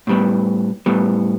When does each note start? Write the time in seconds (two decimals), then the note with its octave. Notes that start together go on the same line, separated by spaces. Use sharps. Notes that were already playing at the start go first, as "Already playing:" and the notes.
0.07 A2 G3 B3
0.86 A2 G3 B3